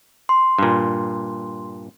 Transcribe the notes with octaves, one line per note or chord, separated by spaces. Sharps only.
C6
G2 A#2